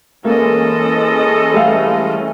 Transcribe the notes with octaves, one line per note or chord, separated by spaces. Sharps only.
E3 G#3 A#3 C#4 A4 D#5
G3 A3 F5